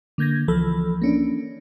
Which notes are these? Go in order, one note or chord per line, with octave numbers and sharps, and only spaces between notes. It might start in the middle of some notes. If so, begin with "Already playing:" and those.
D3 A#3 G6 G#6 A#6
C#2 E3 F3 A4 B5 E6
A#3 C#4 D4